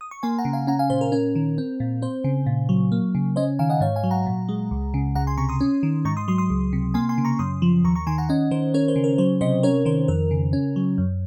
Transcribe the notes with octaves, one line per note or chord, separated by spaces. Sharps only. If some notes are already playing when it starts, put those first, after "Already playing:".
D#6
C#6
A#3 G#5 C6
F#5 A#5
C#3
F5 G#5
C#4 F#5 A#5
F5 G#5
A#2 C5
A#4
C#4 A#4
D#3
C4
A#2
C4 C5
C#3
A#2
F#3
A#3
C#3
C#4 C5 D#5
D#3 F5 G#5
D#5 F#5
G#2 C#5 F5
F5 G#5
F#3
F#5 A#5
A#2
G#3
C#2
C#3
C#2 F#5 A#5
G#5 C6
C3 A#5 C#6
C6 D#6
C#4
D#3
G#2 A#5 C#6
C6 D#6
F#3 C6 D#6
C6 D#6
C#2
C3
A#3 G#5 C6
G#5 C6
C#3
A#5 C#6
F#2 C6 D#6
F3
D#2 A#5 C#6
A#5 C#6
D#3 G#5 C6
F#5 A#5
C#4 D#5 F#5
D#3 C5
C#4 A#4 C#5
C5
C#3
A#4
F#3 C5
C3 C5 D#5
C#4 A#4 C#5
D#3 C5
F2 A#4
C#3
C#4
F#3
F#2